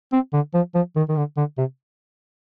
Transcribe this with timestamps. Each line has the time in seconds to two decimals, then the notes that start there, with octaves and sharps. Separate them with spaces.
0.12 C4
0.33 D3
0.54 F3
0.75 F3
0.96 D#3
1.09 D#3
1.17 D3
1.37 D3
1.58 C3